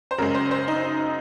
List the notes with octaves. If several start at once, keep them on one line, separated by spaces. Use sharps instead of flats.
C5
F#2 C#3 G#3 A#4
C5
C5
D#4